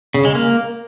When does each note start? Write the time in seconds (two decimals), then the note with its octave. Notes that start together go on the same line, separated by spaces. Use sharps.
0.14 C#3
0.25 G#3
0.35 A#3